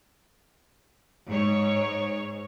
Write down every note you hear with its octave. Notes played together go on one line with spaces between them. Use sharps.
G#2 C#5